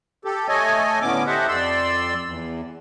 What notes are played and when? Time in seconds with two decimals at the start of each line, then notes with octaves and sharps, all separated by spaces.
0.25 G4 A4
0.48 A3 A4 C#5 D#5 G#5
1.02 A2 D3 B3 C#4 D6
1.27 G4 A4 C5 D#5 E5 F#5
1.48 F2 D5 C6 E6
2.25 E2